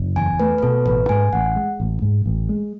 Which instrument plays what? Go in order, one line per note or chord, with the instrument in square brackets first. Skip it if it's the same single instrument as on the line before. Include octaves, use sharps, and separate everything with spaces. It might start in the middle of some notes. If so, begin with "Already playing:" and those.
Already playing: [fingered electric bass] F#1
[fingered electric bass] E2 [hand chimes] G#5
[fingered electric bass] A3 [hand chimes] B4
[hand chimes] B4
[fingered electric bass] B2 [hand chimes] A4
[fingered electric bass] A1 [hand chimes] B4
[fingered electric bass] G#2 [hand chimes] G#5
[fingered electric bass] A1 [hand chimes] F#5
[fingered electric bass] G#3
A1
G#2
A1
G#3